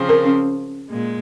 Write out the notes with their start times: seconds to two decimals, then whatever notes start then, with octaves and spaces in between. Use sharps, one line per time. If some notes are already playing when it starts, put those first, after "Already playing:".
Already playing: C#3 F3 C4
0.09 A#4
0.25 C#4
0.90 A#2 G#3